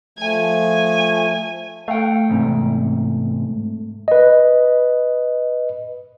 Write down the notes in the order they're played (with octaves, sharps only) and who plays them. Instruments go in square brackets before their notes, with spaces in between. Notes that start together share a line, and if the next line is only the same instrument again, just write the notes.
[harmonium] F3 A3 [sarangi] G#5
[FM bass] A3 [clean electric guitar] F5 G5
[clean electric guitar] E2 G#2 C3
[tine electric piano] B4 D#5